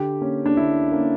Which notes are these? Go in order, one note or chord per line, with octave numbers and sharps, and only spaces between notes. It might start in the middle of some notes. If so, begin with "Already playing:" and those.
Already playing: D3 G4
A#3 C#4
D4
D3 E4
A#3 C#4